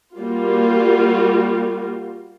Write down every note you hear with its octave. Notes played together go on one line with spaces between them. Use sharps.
G3 A#3 F4 F#4